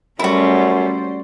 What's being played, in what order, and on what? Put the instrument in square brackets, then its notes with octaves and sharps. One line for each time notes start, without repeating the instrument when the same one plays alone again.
[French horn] F#2 [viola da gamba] G3 A3 [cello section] C#4 C5 D5 [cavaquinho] E4 F#4